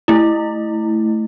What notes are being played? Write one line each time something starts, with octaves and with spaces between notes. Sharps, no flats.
A3 E4